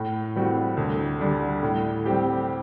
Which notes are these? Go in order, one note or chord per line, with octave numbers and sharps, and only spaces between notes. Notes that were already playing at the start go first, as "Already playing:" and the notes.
Already playing: A2
E3 G3 C4 F#4
D2
D3 G3 D4
A2
G3 C4 G4